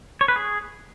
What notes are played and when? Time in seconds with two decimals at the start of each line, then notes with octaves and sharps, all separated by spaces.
0.21 C#5
0.28 B4
0.36 G#4